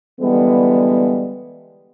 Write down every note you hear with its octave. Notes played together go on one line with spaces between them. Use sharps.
D3 E3 G3 G#3 B3